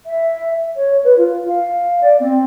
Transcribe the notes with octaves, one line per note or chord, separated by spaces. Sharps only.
E5
C#5
B4
F4
F5
D5
C4